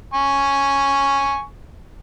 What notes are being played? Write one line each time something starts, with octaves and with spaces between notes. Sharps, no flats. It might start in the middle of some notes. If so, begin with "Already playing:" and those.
G#5 C#6